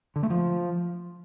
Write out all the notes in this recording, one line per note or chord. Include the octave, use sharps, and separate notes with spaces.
D3
A3
F3